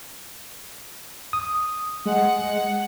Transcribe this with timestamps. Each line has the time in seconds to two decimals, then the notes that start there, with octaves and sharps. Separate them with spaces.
1.33 D#6
2.06 G#3 F#5